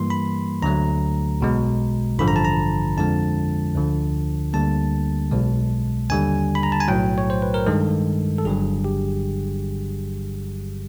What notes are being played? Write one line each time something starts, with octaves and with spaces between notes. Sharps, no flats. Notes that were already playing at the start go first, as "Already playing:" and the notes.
Already playing: G2 E3 G3 A#3 C6
B5
D2 D3 F#3 A3 A#5
B1 B2 G#3
A1 G2 D3 F3 B5
A#5
A5
A#5
F2 D3 F3 G#3 A5
D2 D3 F3
D2 D3 G3 A#3 A5
B1 B2 G#3
D#2 D3 G3 G#5
B5
A#5
A5
G#5
B1 A2 F#3 G5
C#5
C5
B4
A#4
G2 D#3 G#3 A4
A4
G1 G2 D3 F#3 G#4
G4